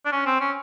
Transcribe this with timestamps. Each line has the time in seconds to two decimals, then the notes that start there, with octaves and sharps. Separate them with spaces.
0.06 D4
0.12 C#4
0.26 C4
0.41 C#4